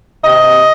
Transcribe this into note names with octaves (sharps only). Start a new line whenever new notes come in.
C3 D#5